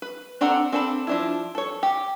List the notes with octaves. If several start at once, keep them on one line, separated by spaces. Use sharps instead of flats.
B4
C4 D4 A4 F#5 A#5
C4 D4 A4 A5 B5
F3 D4 E4
A4 C#5
G4